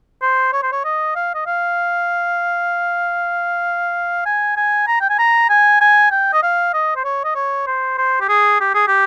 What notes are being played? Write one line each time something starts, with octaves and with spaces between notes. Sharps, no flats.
C5
C#5
C5
C#5
D#5
F5
D#5
F5
G#5
G#5
A#5
G5
G#5
A#5
G#5
G#5
G5
D#5
F5
D#5
C5
C#5
D#5
C#5
C5
C5
G4
G#4
G4
G#4
G4